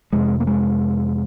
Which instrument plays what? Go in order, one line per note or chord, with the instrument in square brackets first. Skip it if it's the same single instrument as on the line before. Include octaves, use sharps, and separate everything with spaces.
[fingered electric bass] F2 C3 G#3
A#3
G#3